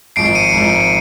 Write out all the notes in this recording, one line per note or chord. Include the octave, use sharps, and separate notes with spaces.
G#1 G#2 F3 C7 D7
C#7 D#7
G#1 G#2 F3